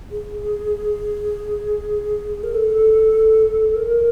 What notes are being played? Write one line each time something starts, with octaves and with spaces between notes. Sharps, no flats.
G#4
A#4
A4
A#4